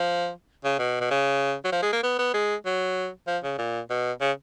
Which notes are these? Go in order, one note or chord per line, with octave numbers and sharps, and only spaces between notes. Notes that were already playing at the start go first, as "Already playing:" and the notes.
Already playing: F3
C#3
B2
B2
C#3
F#3
F3
G#3
A#3
B3
B3
G#3
F#3
F3
C#3
A#2
B2
C#3